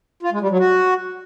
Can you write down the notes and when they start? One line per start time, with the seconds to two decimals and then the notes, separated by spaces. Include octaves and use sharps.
0.23 F4
0.32 G#3
0.41 G3
0.50 F#3
0.59 F#4